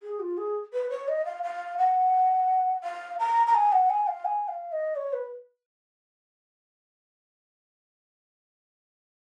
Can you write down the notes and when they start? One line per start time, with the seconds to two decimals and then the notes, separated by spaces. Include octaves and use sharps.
0.02 G#4
0.20 F4
0.37 G#4
0.73 B4
0.90 C#5
1.08 D#5
1.25 F5
1.43 F5
1.78 F#5
2.84 F5
3.19 A#5
3.47 A#5
3.54 G#5
3.72 F#5
3.90 G#5
4.07 F5
4.25 G#5
4.48 F5
4.72 D#5
4.96 C#5
5.13 B4